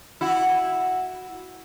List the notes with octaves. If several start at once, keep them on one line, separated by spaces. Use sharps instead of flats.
E4 F#4